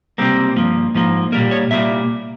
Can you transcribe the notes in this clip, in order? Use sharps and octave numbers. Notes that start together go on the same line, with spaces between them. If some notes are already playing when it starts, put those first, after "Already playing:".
C#2 C3 G3 A#3 C4
G2 F3 A#3
G#2 F3 A#3
A#2 G3 A#3 A#4
C#5
C2 A#2 G3 A#3 E5